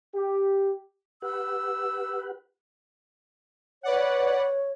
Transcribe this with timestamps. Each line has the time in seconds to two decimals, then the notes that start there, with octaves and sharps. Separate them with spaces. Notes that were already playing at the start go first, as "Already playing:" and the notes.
0.15 G4
1.22 G4 B4 F#5 E6
3.83 B4 C#5 D5 F#5